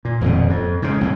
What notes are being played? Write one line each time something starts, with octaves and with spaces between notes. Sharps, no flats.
A#2
D#1 F2 G#2 B2
F2
G#2 C#3
C2 A2 C#3